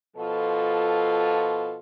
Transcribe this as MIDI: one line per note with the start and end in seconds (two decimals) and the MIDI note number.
0.17 1.78 47
0.17 1.78 53
0.17 1.78 65
0.17 1.78 69